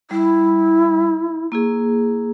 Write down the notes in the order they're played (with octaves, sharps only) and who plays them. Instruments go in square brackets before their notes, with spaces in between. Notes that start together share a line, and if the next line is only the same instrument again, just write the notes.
[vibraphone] G3 [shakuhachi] E4
[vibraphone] A#3 E4 G#4